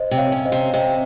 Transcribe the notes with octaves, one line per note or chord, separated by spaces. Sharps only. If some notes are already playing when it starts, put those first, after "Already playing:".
Already playing: C5 D#5
C3
C#5 F5
C#4
C5 D#5
C3
C3 C5 D#5